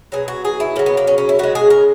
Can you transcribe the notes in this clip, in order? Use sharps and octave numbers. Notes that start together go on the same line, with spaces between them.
B2 F#3 G#4
F#4
G#4
E4
C#3 F#3 A#3
B3
A#3
C#4
C#4
E4
C#3 G#3 F#4
G#4
A#4